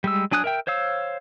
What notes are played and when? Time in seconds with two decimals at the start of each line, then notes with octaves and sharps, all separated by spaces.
0.04 G3 G#3 E6
0.31 F#3 D4 G#5 D#6 F#6
0.44 A#4 E5 G5
0.67 C5 C#5 F5 E6